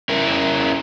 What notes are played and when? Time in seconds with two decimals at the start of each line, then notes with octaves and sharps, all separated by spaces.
0.09 C#4 E4 A#4